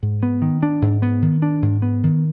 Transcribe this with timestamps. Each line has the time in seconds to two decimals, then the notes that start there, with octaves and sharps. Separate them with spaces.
0.03 G#2
0.23 B3
0.42 D#3
0.63 D4
0.82 G#2
1.02 B3
1.22 D#3
1.42 D4
1.62 G#2
1.82 B3
2.03 D#3